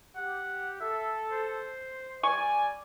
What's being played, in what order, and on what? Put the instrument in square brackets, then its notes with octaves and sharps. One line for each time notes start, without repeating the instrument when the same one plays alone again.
[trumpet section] G4 [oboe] F#5
[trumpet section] A4 [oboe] E5
[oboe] C5
[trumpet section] G3 D5 [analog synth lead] G#5 [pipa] C#6